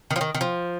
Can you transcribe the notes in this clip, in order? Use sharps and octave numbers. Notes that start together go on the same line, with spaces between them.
D#3
F3
D#3
D#3
F3